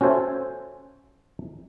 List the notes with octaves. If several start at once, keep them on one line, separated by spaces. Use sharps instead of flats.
C#4 F#4 A4 C5 E5 G#5